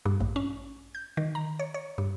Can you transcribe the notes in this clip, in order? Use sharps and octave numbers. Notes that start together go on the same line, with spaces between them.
G2
A1
C#4
G6
D#3
A#5
C#5
C#5
G2